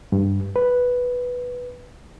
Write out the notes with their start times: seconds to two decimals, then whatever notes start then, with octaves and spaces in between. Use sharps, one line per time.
0.12 G2
0.56 B4